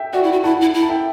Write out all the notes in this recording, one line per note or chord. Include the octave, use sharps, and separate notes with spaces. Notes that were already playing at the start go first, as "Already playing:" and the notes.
Already playing: E5 G5
F#4 D5 F#5
E4
F#4
E4 F#5 A5
E4
E4
A5
E5 G5